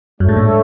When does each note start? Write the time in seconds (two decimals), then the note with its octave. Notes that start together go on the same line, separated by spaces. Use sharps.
0.20 F#2 A3 D4 A4 C#5 E5
0.29 G#2
0.37 A2